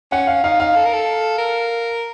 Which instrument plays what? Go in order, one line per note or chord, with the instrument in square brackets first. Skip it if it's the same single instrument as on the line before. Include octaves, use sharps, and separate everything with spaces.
[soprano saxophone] C#4 [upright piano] F#5
[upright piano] F5
[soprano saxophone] D#4 [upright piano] F5
[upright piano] F5
[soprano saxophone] A4
A#4
A4
A#4